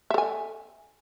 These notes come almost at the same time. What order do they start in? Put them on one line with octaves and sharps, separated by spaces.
E5 A4 G#5